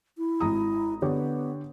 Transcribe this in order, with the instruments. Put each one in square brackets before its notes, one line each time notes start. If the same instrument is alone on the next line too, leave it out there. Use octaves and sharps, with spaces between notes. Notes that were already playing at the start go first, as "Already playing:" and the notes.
[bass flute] E4
[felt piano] G#1 A#5 D#6
[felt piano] D3 G4 C#5 [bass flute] B3